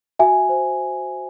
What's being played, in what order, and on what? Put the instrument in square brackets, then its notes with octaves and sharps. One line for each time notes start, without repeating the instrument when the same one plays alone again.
[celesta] F#4 E5 G#5
C5